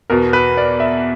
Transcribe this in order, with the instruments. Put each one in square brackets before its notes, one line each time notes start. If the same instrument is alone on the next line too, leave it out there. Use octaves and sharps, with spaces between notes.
[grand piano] E2 B2 A#4
B4
D5
E5